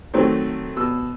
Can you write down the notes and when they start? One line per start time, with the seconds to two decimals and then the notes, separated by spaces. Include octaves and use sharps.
0.13 D#3 F#3 A3 C4
0.76 B2 E6